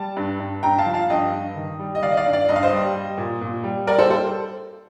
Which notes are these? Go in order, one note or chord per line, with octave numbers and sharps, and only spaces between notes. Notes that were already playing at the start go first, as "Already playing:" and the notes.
Already playing: G3 A5
G2
G2
G2 G5 A#5
F5 A5
F3
F5 A5
G2 D#5 G5
G2
D#3
G3
D#5
D#3 D5 F5
D#5
D5 F5
G2
D5 F5
G2 D#5
F5
C5 D#5
G3
G3
A#2
A#2
G3
G3 A#4 D5
A4 C5
G3 A4 C5